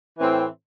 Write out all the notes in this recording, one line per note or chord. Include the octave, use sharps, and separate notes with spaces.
A2 E3 C4